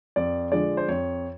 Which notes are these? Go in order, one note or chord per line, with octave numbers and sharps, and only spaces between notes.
F2 D5
D3 F3 G#3 D5
C5
F2 C#5